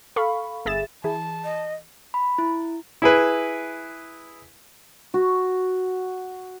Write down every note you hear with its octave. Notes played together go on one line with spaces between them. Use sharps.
A4 F5 B5 C#6
G1 G#4 E5 A6 E7
E3 G#4 A5
D#5
B5
E4
E4 G#4 B4
F#4